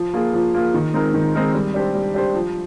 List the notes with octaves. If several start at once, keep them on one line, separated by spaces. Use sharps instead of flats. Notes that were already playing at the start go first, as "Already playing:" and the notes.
Already playing: F3
A#3 F4 G#4
F3
A#3 F4 G#4
D#3
G#3 C4 D#4 A#4
D#3
G#3 C4 D#4 A#4
G3
D4 G4 C5
G3
D4 G4 C5
F3